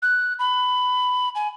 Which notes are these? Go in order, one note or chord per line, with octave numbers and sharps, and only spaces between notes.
F#6
B5
G#5